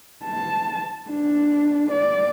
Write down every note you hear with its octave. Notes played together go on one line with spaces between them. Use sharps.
A5
D4
D5